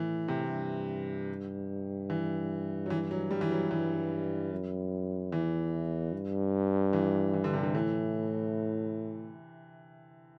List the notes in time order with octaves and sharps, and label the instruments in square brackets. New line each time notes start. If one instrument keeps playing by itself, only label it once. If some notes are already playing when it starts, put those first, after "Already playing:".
Already playing: [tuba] A2 [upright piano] E3
[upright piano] C3
[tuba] G2
[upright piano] E3
F#3
E3
F#3
G3
E3
F#3
[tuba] G2 [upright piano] E3
[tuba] F#2
[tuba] E2 [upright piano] E3
[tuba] G2
[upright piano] E3
E3
D3
C3
D3
[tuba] A2 [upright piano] E3